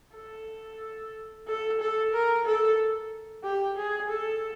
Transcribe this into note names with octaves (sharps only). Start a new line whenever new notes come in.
A4
A4
A4
A#4
A4
G4
G#4
A4